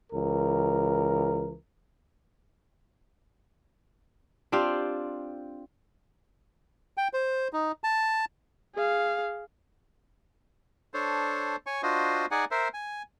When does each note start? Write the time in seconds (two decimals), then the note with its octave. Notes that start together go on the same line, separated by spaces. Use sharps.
0.12 C#2 E3 A#4
4.52 C4 D4 F4 G4
6.97 G5
7.13 C5
7.53 D#4
7.84 A5
8.75 G#4 F5
10.94 D4 A4 C5 C#5
11.66 C#5 G#5 C#6
11.83 D4 F4 F#4 C5 D#5
12.31 D#4 G#4 D5 F#5 G#5
12.51 A#4 C5 E5
12.74 G#5